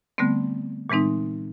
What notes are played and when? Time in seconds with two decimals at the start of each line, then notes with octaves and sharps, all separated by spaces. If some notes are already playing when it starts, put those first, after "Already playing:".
0.18 D3 G3 A3 B3 C4
0.90 A#2 E3 G#3 C4 D#4